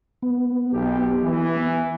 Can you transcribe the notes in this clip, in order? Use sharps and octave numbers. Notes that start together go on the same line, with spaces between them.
B3
B1 G4
E3